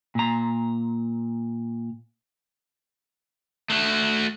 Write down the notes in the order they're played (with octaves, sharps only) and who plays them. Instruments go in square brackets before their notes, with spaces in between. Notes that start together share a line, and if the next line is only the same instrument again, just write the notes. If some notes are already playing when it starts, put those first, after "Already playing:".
[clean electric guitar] A#2 A#5
[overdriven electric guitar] A3 F#4